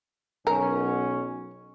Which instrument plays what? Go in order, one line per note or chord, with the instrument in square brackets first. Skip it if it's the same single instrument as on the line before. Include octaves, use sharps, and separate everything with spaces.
[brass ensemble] B1 C#4 [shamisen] A#4